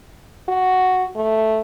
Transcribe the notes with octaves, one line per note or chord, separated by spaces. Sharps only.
F#4
A3